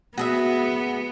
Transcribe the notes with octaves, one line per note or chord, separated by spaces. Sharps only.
B3 F#4 G#4 E5